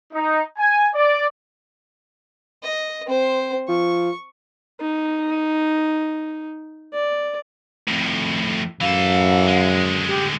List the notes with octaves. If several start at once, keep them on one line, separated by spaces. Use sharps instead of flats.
D#4
G#5
D5
D#5
C4 C5
F3 C#6
D#4
D5
F2 A2
F#2 E3 A4 F5
D3 G#3
G4